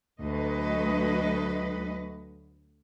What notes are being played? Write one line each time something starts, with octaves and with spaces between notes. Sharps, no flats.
D2 F#3 A3 B4 D#5